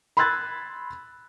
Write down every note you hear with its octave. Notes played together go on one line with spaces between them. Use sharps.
B5 C6 E6 F#6 G#6 A6